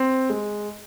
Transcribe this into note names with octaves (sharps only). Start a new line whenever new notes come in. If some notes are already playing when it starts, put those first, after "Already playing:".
Already playing: C4
G#3